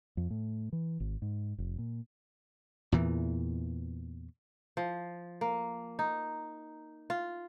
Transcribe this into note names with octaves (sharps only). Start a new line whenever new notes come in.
F2
A2
E3
G#1
G#2
F1
A#2
E2 A#2 E3
F3
A#3
D#4
F4